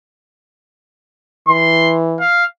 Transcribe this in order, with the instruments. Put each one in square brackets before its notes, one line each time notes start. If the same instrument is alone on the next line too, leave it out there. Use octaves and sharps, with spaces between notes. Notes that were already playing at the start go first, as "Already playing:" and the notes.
[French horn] E3 [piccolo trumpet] C6
[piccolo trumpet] F5